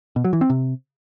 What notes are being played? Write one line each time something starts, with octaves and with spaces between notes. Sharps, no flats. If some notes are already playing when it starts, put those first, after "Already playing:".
B2
F#3
E3
C4
C3